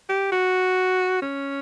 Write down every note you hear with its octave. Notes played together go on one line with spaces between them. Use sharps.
G4
F#4
C#4